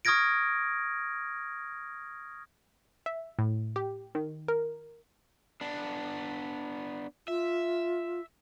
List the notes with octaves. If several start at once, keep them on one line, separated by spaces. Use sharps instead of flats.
C#6 D#6 F6 G#6 A#6 D7
E5
A2
G4
D#3
A#4
B3 D4
F4 E5